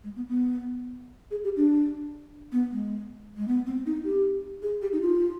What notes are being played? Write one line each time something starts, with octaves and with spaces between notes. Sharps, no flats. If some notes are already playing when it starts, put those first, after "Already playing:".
G#3
B3
B3
G#4
G4
D4
B3
G#3
G#3
B3
C4
D#4
G4
G#4
G4
D#4
F4